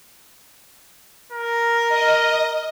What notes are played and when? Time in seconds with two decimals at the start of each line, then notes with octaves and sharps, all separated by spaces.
1.32 A#4
1.89 D#5